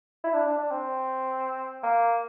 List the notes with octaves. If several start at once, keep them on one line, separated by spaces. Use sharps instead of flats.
E4
D4
D4
D4
C4
A#3